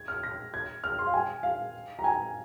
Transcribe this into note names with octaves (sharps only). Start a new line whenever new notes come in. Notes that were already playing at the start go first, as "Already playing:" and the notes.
Already playing: G#6
F6
A#6
G#6
F6
C6
F5
G#5
F5
A#5
G#5